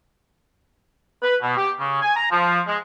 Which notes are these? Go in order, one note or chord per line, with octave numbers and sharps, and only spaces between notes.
B4
B2
G4
C#3
G#5
A#5
F3
G#3